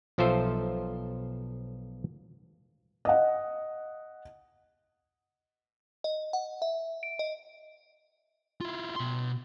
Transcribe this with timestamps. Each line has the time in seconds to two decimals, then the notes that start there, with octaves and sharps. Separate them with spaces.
0.18 B1 F3 F4 A4 C5 E5
3.05 D#5 F#5
6.04 D#5
6.33 F#5
6.62 E5
7.03 D7
7.19 D#5
8.61 E4 F4
8.96 B2 C6